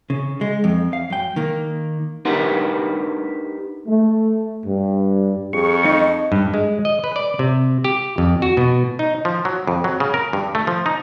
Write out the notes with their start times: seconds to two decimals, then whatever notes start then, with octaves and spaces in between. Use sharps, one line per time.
0.10 C#3
0.41 G#3
0.64 F2
0.93 F5
1.10 F#2 G5
1.36 D#3 A#3
2.25 D4 D#4 G4 A#4 B4 F#5
3.87 A3
4.65 G2
5.53 F2 G#4 C#6
5.85 D#4 D#5
6.32 G2
6.54 G#3
6.85 D#5
7.04 B4
7.16 D5
7.39 C3
7.84 G4
8.18 F2
8.42 F#4
8.57 B2
8.99 D#4
9.25 F3
9.45 F#3
9.67 F2
9.84 F#3
10.00 C#3
10.14 A#4
10.33 G2
10.55 A3
10.67 F3
10.86 D#4